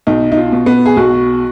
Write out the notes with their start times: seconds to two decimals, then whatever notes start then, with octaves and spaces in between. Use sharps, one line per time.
0.07 B1 D#4
0.32 D#4
0.37 F4
0.52 B2
0.66 B3
0.86 G#4
0.97 B1 F#4